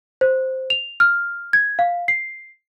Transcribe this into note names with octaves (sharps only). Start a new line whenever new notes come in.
C5
F7
F6
G#6
F5
C7